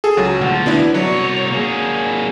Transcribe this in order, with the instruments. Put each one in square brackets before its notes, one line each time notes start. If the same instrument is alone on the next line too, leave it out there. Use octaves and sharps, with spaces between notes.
[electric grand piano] G#4 A4
C#2 F#3
[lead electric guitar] D2 F3 [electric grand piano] F#5
[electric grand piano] B3 D4 E4
[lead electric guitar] C2 C#5 [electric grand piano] F#3 D5
[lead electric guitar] A#3 G#4